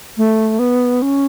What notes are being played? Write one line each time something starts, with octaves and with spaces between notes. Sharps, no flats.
A3
B3
C#4